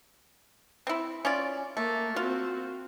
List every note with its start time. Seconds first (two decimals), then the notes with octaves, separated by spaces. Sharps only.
0.87 C4 E4
1.25 C#4 F4 D5
1.77 A3 A#3
2.16 C4 F4 F#4